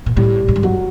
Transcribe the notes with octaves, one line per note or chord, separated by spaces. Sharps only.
A#2
A2 G3
G#2
G2
F#2 F#3